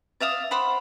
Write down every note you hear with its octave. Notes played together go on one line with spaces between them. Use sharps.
D5 E5 F5 D#6
C5 F#5 B5 D6